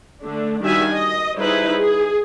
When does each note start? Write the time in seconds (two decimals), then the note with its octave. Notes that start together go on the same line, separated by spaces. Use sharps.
0.24 D3 A3 D4
0.63 D#3 G3 D4 F#4 E5 G#5
0.93 D#5
1.38 G3 D#4 E4 G#4 B4 C5
1.78 G#4